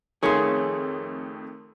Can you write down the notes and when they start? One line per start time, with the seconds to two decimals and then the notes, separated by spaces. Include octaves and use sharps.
0.23 F2 D#3 A3 G#4 A#4 C#5 C6